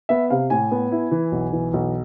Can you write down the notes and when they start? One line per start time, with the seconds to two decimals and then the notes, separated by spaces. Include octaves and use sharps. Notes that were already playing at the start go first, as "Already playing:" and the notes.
0.09 B3 E5
0.30 C3 F5
0.50 A2 G#5
0.71 B3
0.92 E4
1.11 E3
1.32 B1
1.53 E3
1.74 B1